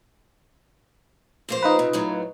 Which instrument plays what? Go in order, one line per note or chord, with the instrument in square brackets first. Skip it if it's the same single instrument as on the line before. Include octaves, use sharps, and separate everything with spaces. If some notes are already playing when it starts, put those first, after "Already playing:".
[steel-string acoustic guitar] F2 A#3 C5
[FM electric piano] D#4 F4 B4
[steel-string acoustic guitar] C3
F#2 A2 F#3